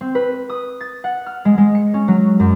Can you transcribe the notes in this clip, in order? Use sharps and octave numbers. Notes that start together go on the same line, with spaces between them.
C4
B4
D#6
A6
F#5
F6
G#3
G#3
C#7
C#4
F#3
F#2